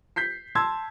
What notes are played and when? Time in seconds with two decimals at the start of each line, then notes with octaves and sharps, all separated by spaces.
0.16 G6 B6 C7
0.55 A5 C6 E6 G#6